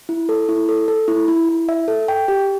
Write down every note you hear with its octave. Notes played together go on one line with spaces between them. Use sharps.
E4
A4
E4
A4
A4
E4
E4
E4
E5
A4
G5
G4